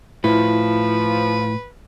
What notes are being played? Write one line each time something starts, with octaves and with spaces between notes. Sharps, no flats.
A2 F3 E4 B4